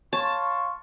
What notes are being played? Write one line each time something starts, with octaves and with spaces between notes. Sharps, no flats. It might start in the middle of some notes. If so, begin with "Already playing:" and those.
C#5 F5 A5 C6 C#6